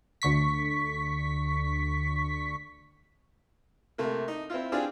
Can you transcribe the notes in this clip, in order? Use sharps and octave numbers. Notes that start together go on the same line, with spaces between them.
D2 D3 C#6 B6
C3 A3 A#3
D#4
C4 E4 F4
C4 D4 F4 G4 G#4